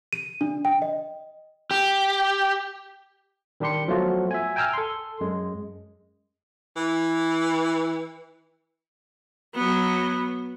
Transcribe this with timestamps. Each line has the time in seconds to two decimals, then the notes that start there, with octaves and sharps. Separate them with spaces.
0.13 D#7
0.41 D4
0.65 G5
0.82 D#5
1.71 G4
3.60 D#3 G3 D4 G4 C6 C#7
3.88 F3 F#3 A3 B3 F4 F#4
4.31 E5 G#5
4.56 G5 G#5 A#5 E6 F6
4.73 A4 C6
5.21 F#2 G#3
6.76 E3
9.55 F#3 B3